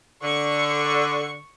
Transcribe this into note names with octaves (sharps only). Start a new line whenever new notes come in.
D3 C#6